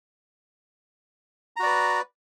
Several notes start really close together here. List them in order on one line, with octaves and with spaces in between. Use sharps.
A#5 F#4 D5 B4